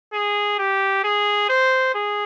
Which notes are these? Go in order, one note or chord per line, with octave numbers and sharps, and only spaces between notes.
G#4
G4
G#4
C5
G#4